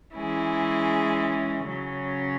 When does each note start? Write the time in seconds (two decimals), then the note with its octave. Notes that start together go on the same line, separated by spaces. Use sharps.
0.13 E3 G#3 C#4 E4 G#4
1.66 C#3 F#3 C#4